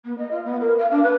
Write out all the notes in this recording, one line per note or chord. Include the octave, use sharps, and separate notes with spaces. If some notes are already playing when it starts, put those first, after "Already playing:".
B3
D#5
F4
B3
A#4
F5
D4
B4